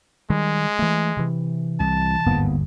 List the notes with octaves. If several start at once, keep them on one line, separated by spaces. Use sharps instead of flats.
D#3 G3 G#3
E3 A3
C3 E3
C2 A5
G1 D#2 G#2 A#3 B3